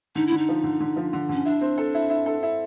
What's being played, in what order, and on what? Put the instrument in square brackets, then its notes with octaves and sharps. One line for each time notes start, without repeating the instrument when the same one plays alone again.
[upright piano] D3 [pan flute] D#4
[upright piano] D3 [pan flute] E4
[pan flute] D#4
[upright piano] F3
D3
D3
F3
D3
[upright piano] D3 [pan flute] C#4
[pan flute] D4 [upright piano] E4
[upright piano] C4
A4
E4
E4
A4
E4